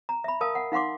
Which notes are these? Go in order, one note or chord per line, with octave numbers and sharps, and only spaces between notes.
A#5
E5 B5
A#4 F5 A5 D#6
F#5
D#4 F5 F#5 C6 D6